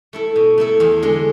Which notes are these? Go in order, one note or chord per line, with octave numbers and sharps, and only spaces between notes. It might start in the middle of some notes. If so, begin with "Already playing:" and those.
A3 E4 A4
B2
A3 E4 A4
E2
D3 G#3